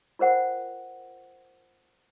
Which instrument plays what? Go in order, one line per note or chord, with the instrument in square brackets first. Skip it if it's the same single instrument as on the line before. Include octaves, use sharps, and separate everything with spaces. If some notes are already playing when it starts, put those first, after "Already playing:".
[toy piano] F4 A#4 C5 F#5 G5